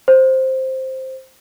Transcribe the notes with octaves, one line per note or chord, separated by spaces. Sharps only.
C5